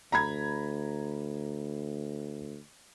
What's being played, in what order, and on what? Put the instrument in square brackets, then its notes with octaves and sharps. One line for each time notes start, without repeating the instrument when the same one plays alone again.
[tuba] D2 [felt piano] A#5 B5 G#6